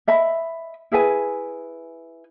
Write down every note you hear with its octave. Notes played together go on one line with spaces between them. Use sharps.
D#5 E5 B5
E4 G#4 B4 G#5